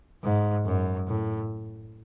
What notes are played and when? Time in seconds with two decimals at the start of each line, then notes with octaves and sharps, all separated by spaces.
0.23 G#2
0.65 F#2
1.08 A2